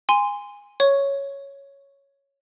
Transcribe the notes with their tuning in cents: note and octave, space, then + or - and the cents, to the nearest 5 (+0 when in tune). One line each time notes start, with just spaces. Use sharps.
G#5 -20 C6 -10
C#5 +0 C#6 +0